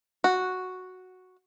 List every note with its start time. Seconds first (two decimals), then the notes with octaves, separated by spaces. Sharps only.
0.24 F#4